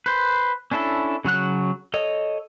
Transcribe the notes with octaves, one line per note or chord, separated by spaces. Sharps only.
B4 C5
C#4 D4 E4 A4
C#3 F#3 F#4 F#6
A4 C#5 D#5